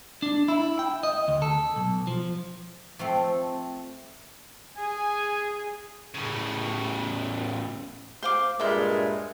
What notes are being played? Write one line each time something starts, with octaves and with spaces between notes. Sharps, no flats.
D4
E4
G5
D#5
D2
A4
B1
F3
F3 A3 C4
G#4 G#5
A2 C#3
C5 F5 D6
G2 A#2 G#3 E5 C6